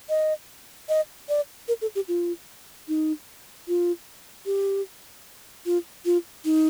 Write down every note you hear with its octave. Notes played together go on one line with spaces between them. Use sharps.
D#5
D#5
D5
A#4
A4
G4
F4
D#4
F4
G4
F4
F4
D#4